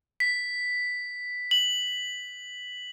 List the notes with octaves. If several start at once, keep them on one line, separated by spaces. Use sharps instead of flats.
B6
F#7